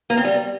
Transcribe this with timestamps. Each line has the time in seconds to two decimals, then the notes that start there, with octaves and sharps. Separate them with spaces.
0.10 A#3
0.17 C4
0.25 G3